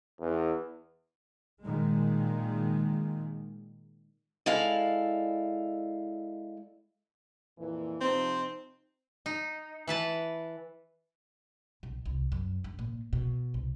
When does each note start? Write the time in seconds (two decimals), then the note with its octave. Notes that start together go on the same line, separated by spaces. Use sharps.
0.21 E2
1.63 A#2 D#3 G#3
4.46 G#3 E4 A4 D5 F5
7.58 F2 A#2 E3
8.01 C3 F3 C4 D#4
9.26 D#4
9.87 E3 B4 A5
11.83 B1
12.05 C2
12.32 F#2
12.64 G2
12.79 A#2
13.13 B2
13.54 C2